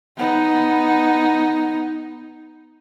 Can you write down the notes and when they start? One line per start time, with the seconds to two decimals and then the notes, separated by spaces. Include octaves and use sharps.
0.17 B3 D#4